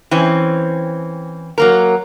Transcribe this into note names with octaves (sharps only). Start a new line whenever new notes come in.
E3 C4 C#4
F#3 A#3 A#4